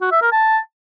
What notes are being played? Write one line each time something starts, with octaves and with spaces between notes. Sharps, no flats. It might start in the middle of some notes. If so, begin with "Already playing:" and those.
F#4
E5
A#4
A5